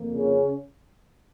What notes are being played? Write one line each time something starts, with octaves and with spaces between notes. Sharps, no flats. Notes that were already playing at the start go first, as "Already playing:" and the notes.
Already playing: F2 F3 A#3
C#3 C#4